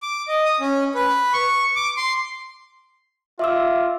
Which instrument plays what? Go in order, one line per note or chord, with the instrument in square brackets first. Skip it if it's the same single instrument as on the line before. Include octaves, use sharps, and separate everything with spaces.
[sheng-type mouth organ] D6
D#5
D#6
C#4
B4
C#6
D6
C6
[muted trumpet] F4 [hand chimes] E5 D6 E6